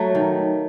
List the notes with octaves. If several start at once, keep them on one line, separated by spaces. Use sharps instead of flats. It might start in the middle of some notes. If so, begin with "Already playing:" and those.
Already playing: F#3 A3
D#3